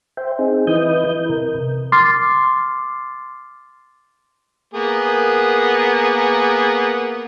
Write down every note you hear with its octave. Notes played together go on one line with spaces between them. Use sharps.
C5 E5 G5
C4 D#4 G#4
E3 E4 B4 D#5 D#6 G6
G6
C3 A#4
C6 D6 F6 A6 C7
A#3 B3 G#4